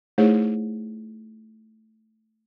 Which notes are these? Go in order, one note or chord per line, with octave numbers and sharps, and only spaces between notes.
A3 D#4 E4 G#4 C5 C#5